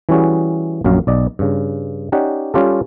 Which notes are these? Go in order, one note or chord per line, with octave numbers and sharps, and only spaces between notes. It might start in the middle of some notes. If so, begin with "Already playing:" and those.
E3 G3 C#4 F#4 G#4
A#1 F#2 F#3 F5
B1 D5 D#5
G2 C#3
C#4 D#4 G4 D5 F#5
G3 C#4 F4 G4 A4